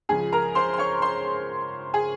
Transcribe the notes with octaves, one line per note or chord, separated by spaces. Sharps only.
C#2 C#3 F3 G#4 G#5
A#4 A#5
C5 C6
C6
C#5 C#6
C5 C6
G#4 G#5